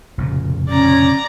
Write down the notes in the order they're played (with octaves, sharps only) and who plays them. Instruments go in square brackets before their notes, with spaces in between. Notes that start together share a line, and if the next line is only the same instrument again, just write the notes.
[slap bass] F1 A#2 C#3
[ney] C#4 [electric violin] D5 A#5